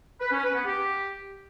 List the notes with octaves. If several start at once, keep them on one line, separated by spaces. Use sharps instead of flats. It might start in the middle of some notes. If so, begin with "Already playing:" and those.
B4
C#4
B4
B3
G4